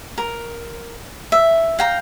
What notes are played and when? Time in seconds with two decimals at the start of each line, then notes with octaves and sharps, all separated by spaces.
0.18 A#4
1.32 E5
1.79 F5 G5 A#5